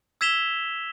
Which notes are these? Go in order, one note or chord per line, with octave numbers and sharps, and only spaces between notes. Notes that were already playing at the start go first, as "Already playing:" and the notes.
E6 G#6 B6 E7 F7 G7